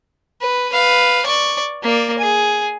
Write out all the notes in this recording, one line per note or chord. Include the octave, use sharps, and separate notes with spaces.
B4
B4 F5
D5 C#6
A#3 D5
G#4